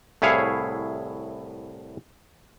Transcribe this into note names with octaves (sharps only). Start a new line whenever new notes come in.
C2 A2 E4 G#4 C#5 F5